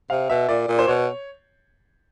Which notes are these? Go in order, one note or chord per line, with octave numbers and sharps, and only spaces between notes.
C3 F5
B2 E5
A#2 D5
A#2
C5
B2 C#5